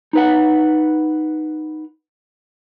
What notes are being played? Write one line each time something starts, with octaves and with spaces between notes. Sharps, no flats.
D#4 B4 F#5